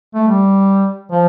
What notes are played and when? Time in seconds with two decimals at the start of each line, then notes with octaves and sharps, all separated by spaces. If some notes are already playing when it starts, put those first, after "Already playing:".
0.14 A3
0.28 G3
1.11 F3